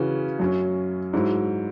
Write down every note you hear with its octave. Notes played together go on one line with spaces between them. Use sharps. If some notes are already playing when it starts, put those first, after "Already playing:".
Already playing: C#3 E3 C#4 F#4
F#2 F#3 C#4
G#2 F#3 E4